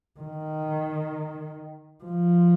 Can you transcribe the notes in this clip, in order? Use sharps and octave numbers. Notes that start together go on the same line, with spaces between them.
D#3
F3